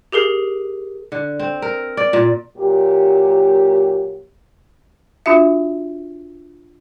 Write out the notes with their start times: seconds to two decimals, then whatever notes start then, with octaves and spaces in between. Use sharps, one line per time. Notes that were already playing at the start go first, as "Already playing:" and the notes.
0.12 G4 G#4 A#4 C7
1.12 D3
1.39 C4
1.62 A#4
1.97 D5
2.13 A#2
2.58 A#2 F#3 A#3 G4
5.26 D4 F4 F#4 E5